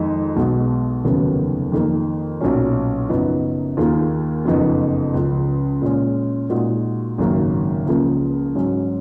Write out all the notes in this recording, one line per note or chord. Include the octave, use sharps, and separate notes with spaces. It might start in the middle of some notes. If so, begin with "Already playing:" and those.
Already playing: F2 D#3 G#3 D#4
B1 B2 G#3
F1 D#2 C#3 F#3 B3
F2 D#3 A#3
B1 A#2 F#3 C#4
F#1 F#2 F3 B3 D#4
D#2 D#3 A#3 F4 G#4
F#1 F2 F3 B3 D#4
C#2 C#3 F3
A#2 G#3 C#4
A#2 G#3 D#4 F#4
G#1 F#2 C#3 F#3 A#3
C#2 C#3 F3 A#3
G#2 F#3 C#4